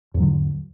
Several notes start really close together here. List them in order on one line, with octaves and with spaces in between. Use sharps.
E2 G#2 F#3 D3